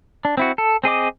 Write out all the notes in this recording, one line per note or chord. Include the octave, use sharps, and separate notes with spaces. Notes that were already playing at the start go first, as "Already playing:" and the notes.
D4
C4 E4 F#4
A4
C4 G#4 D#5 D6